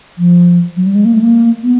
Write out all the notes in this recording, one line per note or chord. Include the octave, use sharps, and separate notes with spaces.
F3
F#3
G3
G#3
A#3
A3
A#3
B3